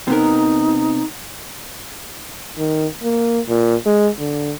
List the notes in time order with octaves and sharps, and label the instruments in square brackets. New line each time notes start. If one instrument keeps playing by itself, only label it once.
[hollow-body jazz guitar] C3 B3 A#4 [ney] D#4
[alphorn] D#3
A#3
A#2
G#3
D3